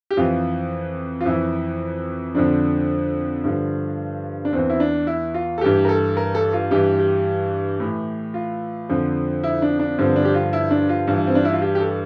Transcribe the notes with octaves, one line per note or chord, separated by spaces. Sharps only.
G4
F2 E3 F4
F4
F2 E3 E4
F2 D3 F3 D4
G2 D3 F3
D4
E2 E3 C4
E4
D4
E4
F4
A4
G2 E3 G4
A#4
A4
A#4
A4
F4
G2 E3 G4
G4
A2 E3
F4
F2 D3 F3
E4
D4
D4
G2 D3 F3 C4
D4
G4
F4
E4
D4
F4
G2 E3
C4
D4
E4
F4
G4
G4
A4